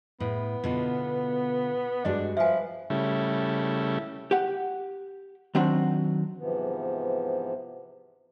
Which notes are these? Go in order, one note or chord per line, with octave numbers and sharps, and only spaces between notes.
A2 B3
B2 D3 F4
G2 G#3 D4 F#4 D#5
F3 G#4 B4 E5 G#5
C#3 G3 A3 E4
G4 F#5
D#3 F#3 C4 D4 F#4
G#2 C3 E3 F3 B3